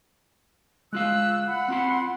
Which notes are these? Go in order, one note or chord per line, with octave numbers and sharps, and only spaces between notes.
G#3 F4 F5 E6 F#6
F#5 B5
C4 F4 B5 C6